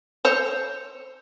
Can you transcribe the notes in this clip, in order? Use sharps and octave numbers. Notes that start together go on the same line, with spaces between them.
C5 C#5